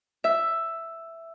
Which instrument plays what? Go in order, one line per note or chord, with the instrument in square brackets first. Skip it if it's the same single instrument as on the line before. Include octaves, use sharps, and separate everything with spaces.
[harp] E5